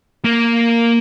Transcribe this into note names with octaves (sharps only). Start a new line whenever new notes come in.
A#3